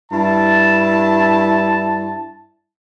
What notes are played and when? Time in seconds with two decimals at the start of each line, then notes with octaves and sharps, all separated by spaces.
0.12 G2 E4 A5